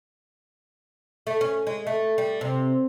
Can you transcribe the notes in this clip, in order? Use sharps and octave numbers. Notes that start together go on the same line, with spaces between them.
A3
C#4
G#3
A3
G3
C3